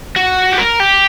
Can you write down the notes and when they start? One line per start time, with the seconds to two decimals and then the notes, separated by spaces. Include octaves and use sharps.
0.16 F#4
0.52 G4
0.58 A#4
0.80 G4